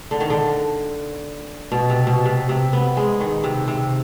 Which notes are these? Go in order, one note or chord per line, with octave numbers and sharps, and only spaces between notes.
D3
D#3
D3
B2
C3
B2
C3
C3
B3
G#3
D#3
C3
C3